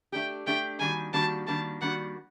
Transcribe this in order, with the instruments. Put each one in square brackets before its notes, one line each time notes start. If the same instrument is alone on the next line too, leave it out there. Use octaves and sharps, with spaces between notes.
[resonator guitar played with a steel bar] A3 D4 G4 [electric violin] G5
[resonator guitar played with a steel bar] A3 D4 G4 [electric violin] G5
[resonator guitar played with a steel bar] D#3 G3 A#3 D4 F#4 [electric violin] G#5
[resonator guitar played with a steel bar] D#3 G3 A#3 D4 F#4 [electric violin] A5
[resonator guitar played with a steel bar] D#3 G3 A#3 D4 F#4 [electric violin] A5
[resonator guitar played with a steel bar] D#3 G3 A#3 D4 F#4 [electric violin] F#5